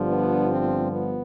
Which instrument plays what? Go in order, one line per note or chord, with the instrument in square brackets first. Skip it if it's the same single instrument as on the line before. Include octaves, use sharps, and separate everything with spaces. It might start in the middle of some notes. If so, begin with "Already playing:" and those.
Already playing: [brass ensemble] G1 G2 D3 F3
B3 D4
C4
B3